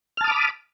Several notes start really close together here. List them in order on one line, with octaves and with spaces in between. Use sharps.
F6 A5 D#6 D6 B5